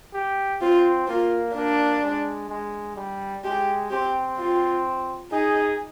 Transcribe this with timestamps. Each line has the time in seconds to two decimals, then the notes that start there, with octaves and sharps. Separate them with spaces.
0.14 G4
0.61 C4 F4
1.08 A#3 F4
1.55 A#3 D4
2.03 G#3
2.49 G#3
2.96 G3
3.44 G#3 G4
3.91 C4 G4
4.38 F4
5.32 D#4 G#4